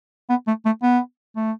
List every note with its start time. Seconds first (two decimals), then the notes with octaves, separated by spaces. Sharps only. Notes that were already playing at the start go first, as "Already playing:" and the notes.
0.30 B3
0.47 A3
0.66 A3
0.83 B3
1.36 A3